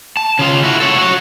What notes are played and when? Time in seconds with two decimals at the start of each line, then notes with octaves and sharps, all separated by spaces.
0.17 A5
0.39 C#3 F4
0.63 E4 F#4
0.80 A4 C#5
0.98 F#4 C#5